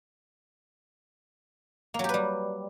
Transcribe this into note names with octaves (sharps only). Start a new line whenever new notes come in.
F#3 G3 A#3 G4 B4